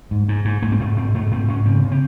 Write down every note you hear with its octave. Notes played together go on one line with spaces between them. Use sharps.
G#2
G#2
G#2
G#2 A3
C4
G#2 A3
G#2 C4
G#2 A3
G#2 C4
G#2 C#4
C#3 C4
C#3
C4